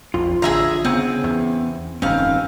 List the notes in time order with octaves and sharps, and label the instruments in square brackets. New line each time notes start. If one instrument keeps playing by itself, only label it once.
[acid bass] A#1 [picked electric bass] F2 [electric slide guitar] F4
[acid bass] A1 [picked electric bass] D3 [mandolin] G#4 E5 A#5
[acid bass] C#3 [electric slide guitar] B3 F#5 G#5 [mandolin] C4
[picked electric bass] E2
[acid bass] F1 [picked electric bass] G2 D#3 [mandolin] C4 F5 [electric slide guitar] C#4